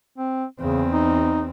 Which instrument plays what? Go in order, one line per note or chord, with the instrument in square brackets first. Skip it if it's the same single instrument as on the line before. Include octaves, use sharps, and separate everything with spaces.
[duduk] C4
[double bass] E2 C4 [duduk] C#3
[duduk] D#4